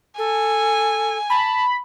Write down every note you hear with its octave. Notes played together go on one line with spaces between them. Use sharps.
A4 G#5
A5 B5